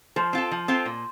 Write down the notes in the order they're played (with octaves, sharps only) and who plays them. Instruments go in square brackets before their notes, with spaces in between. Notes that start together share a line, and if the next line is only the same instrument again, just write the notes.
[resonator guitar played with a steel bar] F3 [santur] C5
[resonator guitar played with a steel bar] C4 F4 A4
F3
C4 F4 A4
A#2